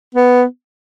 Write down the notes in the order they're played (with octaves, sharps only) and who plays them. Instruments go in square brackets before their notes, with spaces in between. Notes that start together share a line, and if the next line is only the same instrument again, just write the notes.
[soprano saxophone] B3